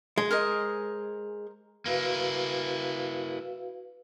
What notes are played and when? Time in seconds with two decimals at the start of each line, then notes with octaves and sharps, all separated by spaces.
0.18 G#3
0.31 A#4 C5 D#5
1.86 A#3 E4 F#4 B4 F5